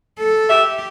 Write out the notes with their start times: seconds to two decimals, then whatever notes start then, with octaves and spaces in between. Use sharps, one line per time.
0.19 A4
0.50 G4 E5